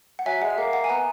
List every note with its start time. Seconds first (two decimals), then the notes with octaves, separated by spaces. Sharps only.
0.19 F#5
0.26 F#3 E5 G#5
0.42 G#3 F#5
0.50 E5
0.58 A#3 F#5
0.73 F#5
0.84 G#5
0.89 B3 F#5 A#5